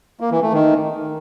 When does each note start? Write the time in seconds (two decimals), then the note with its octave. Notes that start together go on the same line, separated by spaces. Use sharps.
0.20 A#3
0.31 E3
0.42 A3
0.53 D#3